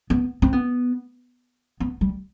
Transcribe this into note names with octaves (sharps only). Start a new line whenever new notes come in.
B3
C4
B3
B3
G3